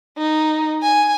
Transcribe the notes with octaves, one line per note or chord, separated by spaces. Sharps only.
D#4
G#5